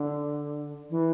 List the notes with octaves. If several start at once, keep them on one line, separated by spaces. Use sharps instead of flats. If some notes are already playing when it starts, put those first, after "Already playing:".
Already playing: D3
E3